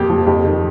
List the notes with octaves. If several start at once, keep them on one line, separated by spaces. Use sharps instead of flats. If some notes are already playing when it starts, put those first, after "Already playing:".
Already playing: F2 A#2 G4
F3
F2 G4
D#3